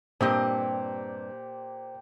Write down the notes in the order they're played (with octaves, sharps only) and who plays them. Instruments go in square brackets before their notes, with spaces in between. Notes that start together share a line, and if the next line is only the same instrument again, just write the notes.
[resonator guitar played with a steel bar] G2 C4 D#5 [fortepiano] A#2 [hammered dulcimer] G4 [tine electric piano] C5